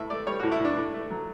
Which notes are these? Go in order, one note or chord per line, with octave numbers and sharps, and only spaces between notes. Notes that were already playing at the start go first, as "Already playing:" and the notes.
Already playing: A2 E5
A3 D5
G3 C#5
A2 F#4
E4
A2 D4
A2
A3
F#3